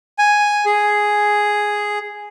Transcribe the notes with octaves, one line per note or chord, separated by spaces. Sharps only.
G#5
G#4